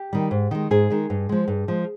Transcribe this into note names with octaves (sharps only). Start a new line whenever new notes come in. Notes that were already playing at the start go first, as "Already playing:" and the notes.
Already playing: G4
D#3 G3
G#2
D#3 G#3
G#2 G#4
D#3 G#3
G2
F3 G#3
G2
F3 G#3